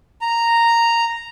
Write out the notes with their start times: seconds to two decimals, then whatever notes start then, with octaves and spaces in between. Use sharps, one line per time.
0.21 A#5